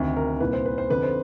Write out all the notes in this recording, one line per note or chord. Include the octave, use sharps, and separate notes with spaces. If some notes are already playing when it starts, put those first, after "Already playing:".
Already playing: D2 C3 D#3
A#4
C2 A#2 B4
C5
B4
C5
F2 D3 B4
C5